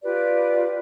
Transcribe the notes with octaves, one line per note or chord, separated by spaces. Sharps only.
F4 G4 B4 D5